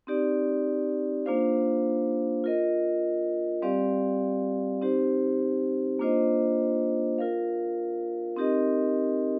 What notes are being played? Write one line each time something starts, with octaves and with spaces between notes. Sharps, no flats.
C4 D#4 G4 D5
A#3 D4 F4 C5 F5
F4 A#4 D#5
G3 C4 G4 D5 F5
C4 D#4 G4 C5
A#3 D4 F4 C5 D#5
F4 A#4 F5
C4 D#4 G4 A#4 D#5